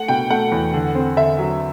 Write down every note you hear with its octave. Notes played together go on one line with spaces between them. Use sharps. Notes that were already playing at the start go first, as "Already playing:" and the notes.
Already playing: A3 F#5
B2 G5
A3 F#5
E2
D3
C4
D3 E5
F#3